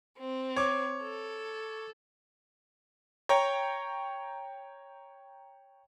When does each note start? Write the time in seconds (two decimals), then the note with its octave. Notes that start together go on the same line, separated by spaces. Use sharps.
0.18 C4
0.56 C#5 D6
1.02 A4
3.29 C#5 G5 A#5